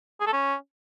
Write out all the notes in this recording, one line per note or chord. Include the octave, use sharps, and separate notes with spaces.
G#4
A4
C#4